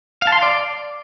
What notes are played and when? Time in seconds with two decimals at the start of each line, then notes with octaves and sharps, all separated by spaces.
0.22 F5
0.27 A5
0.32 C6
0.37 F5
0.42 D5